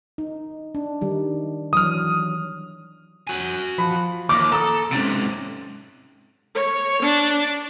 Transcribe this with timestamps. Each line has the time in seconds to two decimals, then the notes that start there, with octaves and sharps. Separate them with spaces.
0.18 D#4
0.75 D4
1.01 D#3 G3 D#4
1.73 E3 F#3 D#6 F6
3.27 F#4 G#5
3.78 F3 B5
4.29 D#2 D6
4.52 A4 A#5 D#6
4.91 G#2 C3 C#4 A6 D7
6.55 C#5
7.02 D4